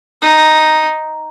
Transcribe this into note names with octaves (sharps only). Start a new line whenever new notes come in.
D#4